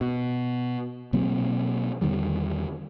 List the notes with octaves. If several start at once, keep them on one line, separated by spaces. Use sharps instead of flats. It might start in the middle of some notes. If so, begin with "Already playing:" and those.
B2
B2 F#3 A#3 C4
E2 D3 D#3 G3